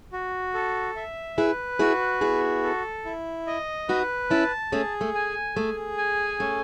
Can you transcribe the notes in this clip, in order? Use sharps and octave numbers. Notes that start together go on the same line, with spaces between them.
F#4
A4
E5
E4 G#4 B4
E4 F#4 G#4
B3 E4 G#4
A4
E4
D#5
D#4 F#4 B4
C#4 E4 A5
A3 C#4 G#4
A3
G#5
A3 G#4
G#5
A3 C#4